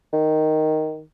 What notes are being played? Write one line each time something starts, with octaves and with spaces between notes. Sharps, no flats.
D#3